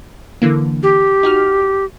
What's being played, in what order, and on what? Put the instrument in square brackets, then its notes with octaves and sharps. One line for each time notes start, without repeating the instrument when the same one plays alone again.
[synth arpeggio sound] D3 E3 A#3
[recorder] G4
[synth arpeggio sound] D#4 F#4 F6